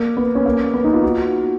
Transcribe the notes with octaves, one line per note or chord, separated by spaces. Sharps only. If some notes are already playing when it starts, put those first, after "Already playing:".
Already playing: A#3
B3
C#4
A#3
B3
D#4
F4
F#4